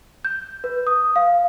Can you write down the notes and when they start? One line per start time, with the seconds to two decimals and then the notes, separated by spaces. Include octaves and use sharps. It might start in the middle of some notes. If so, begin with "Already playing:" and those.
0.25 G6
0.64 B4
0.87 D#6
1.16 F5